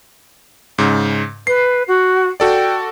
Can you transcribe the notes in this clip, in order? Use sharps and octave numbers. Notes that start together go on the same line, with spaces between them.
G#2 C#3
B4 C7
F#4
F#4 A4 D5 G5